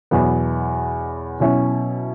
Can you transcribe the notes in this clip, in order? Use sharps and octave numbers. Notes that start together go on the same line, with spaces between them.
E2 B2 F#3 B3
B2 F#3 C#4 E4